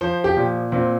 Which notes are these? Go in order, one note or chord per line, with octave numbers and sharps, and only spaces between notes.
F3 C5
G4
A#2
A#2 C4